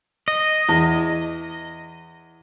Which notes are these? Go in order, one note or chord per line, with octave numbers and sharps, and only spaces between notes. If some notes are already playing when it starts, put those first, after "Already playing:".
D#5
E2